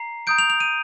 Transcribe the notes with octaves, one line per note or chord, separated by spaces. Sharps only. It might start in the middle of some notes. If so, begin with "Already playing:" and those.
Already playing: A#5 C7
A#5 D#6 G6 D7
F7
F7
D#7